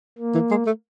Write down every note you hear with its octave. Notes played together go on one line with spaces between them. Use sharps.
A#3
E3
G#3
A3